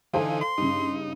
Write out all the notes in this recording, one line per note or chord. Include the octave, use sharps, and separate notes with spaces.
D3 E3 D#4 A4 C5 F5 G#5
C6
G2 C#3 D#4